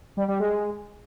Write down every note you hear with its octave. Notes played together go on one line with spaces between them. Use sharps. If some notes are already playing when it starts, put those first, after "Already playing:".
G3
G3
G#3